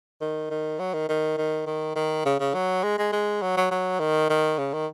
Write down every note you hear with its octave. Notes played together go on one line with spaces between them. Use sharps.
D#3
D#3
F#3
D#3
D#3
D#3
D#3
D#3
C#3
C#3
F#3
G#3
G#3
G#3
F#3
F#3
F#3
D#3
D#3
C#3
D#3